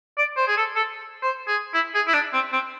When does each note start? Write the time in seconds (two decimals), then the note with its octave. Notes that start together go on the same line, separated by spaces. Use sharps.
0.18 D5
0.37 C5
0.48 G#4
0.57 A4
0.76 A4
1.22 C5
1.48 G#4
1.74 E4
1.95 G#4
2.08 E4
2.14 D4
2.33 C4
2.53 C4